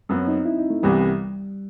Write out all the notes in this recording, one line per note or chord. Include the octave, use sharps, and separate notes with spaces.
F#2 F#3 B3 C4
D#4
E4
D#4
A3
C2 C3 E3 G3 B3